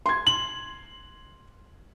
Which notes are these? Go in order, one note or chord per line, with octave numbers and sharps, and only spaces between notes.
C6 G#6
F#7